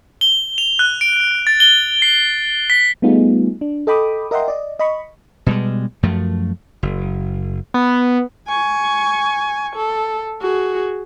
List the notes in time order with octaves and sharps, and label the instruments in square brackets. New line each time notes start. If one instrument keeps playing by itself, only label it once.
[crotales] G7
F7
F#6
D7
A6
G7
C7
B6
[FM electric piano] G3 A3 B3 D#4 F4 G#4
D4
A4 D#5 G5 B5 D6 D#6
A#4 D#5 E5 F#5 G5 C6
D5 D#5
D#5 B5 C#6
[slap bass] B2 G3 G#3
F#2 F3 A3
F#1
[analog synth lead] B3
[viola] G#5 C#6
A4
F#4 G#4